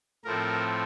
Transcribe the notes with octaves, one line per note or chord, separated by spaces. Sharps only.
A2 F3 A3 C4 A#4